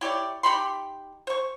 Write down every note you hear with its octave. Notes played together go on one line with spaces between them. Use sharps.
E4 G4 C#5 D5
D#4 G4 B5 C6
C5 C#6